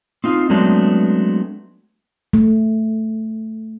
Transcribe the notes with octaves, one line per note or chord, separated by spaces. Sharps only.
C4 D#4 F4
F#3 G#3 A3 B3 C4 D4
A3